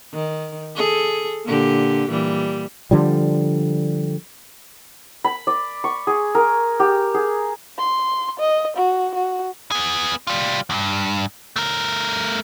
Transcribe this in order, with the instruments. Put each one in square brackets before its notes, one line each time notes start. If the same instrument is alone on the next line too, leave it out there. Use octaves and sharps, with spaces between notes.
[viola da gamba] D#3
G#4 A4
A#2 D3 G4
A#2 E3 G3
[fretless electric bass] D3 F3 G3
[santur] B5
D5
C#6
G#4
A#4
G4
G#4
[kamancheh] C6
D#5
F#4
F#4
[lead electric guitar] B3 G#4
G3 F4
E2 G2
A3 A#4